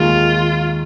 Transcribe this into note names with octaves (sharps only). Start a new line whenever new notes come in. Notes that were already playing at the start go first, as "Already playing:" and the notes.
Already playing: D#2 D#3 G#3 F4